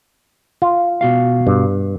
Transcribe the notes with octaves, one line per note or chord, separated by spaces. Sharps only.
F4
B2 F#4 F5
G2